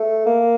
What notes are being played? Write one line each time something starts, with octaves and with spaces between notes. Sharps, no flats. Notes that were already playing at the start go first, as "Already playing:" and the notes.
Already playing: A3
A#3